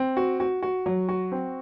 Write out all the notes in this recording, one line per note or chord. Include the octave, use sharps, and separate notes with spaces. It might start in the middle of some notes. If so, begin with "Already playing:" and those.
Already playing: C4
F#4
F#4
F#4
F#3
F#4
C4